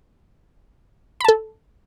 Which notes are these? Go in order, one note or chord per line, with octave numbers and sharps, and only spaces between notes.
A4 A5 B5